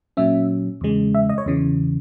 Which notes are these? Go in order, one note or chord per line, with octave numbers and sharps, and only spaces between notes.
A#2 F#3 C#4 E5
E2 C#3 G#3
E5
D#5
C#5
E2 C#3 E3